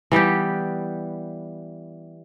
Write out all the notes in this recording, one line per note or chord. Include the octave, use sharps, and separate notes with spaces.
E3 G3 B3 G4